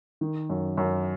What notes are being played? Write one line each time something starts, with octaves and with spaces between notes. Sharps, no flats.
D#3
F#2
F#2